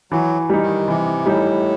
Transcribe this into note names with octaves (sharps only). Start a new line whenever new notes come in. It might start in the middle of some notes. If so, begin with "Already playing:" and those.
E3 F#3
G3 D#4
D#3
C3 E3
A2 G3 D#4